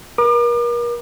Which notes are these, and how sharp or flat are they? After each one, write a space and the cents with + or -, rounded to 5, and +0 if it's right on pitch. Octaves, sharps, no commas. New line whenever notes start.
A#4 +35 D6 +40